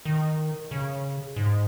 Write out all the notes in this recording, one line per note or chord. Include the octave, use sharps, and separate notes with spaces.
D#3
C#3
G#2